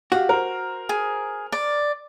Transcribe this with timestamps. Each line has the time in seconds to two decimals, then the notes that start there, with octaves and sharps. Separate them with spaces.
0.12 F#4 G4 F5
0.29 A#4 C5
0.89 G#4
1.52 D5